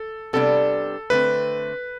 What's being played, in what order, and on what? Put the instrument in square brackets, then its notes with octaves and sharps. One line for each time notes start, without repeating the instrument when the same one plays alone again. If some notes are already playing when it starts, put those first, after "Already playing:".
Already playing: [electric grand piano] A4
[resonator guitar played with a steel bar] C3 G3 B3 D4 [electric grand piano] A4
[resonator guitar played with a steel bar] D3 A3 C4 [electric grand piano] B4